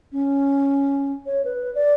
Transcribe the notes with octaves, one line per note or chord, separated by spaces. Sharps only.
C#4
C#5
B4
D5